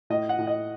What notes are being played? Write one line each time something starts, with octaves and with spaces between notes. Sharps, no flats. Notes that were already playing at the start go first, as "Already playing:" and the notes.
A2 D#5
F#5
A2
D#5